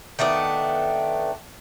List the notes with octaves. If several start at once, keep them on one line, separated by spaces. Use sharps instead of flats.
D#3 A3 B3 D4